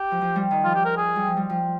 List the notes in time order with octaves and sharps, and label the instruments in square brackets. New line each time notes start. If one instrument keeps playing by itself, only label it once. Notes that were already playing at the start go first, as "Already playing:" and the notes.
Already playing: [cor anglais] G4
[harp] F3
F3
G3
D#3
[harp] F3 [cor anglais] F4
[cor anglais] G4
A#4
G#4
[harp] G3
F3
G3
F3